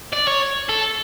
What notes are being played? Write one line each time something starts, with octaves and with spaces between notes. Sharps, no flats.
D5
C#5
A4